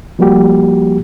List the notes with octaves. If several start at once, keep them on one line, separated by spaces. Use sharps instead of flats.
F3 G3 A#3 F#4 G4